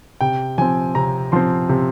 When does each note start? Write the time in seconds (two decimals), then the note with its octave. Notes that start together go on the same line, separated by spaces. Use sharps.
0.21 C3 G5
0.58 F3 C4 G#5
0.95 C3 A#5
1.32 F3 C4 C6
1.69 C3